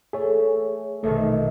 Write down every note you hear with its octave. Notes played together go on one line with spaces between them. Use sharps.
A3 G#4 C#5
A#1 B2 D#3 A3